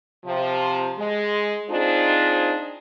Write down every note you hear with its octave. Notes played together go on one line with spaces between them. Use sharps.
C3 F3
G#3
C4 D4 D#4 F4 G#4 C5